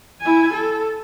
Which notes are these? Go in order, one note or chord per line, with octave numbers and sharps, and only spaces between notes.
E4 G#5
A4